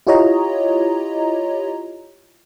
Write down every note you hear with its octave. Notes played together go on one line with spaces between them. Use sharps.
E4 F4 G4 C#5 D#5 A#5